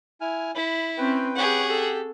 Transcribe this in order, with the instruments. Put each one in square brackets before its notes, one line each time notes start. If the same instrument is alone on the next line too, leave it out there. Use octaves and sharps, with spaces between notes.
[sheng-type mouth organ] E4 G#5 F6
[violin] E4 [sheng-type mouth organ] B5
[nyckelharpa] C4 C#4 [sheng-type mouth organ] B4 G5
[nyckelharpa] G4 C#5 [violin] G#4 F#5
[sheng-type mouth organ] G4 [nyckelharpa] A4